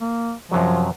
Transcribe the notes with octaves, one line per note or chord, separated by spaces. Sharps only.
A#3
F#2 C3 F3 F#3